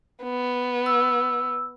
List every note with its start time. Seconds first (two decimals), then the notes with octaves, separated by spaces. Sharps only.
0.23 B3
0.86 E6